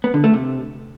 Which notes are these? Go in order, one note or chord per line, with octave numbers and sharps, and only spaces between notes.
B3
D3
A3
C3